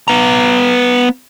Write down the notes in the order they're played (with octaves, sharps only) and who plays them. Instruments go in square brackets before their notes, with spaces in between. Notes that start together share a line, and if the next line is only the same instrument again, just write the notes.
[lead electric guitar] B3 A#5